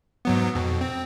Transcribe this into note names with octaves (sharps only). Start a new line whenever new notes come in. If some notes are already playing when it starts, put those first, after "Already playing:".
G#2 F#3 B3
F2 B2
C4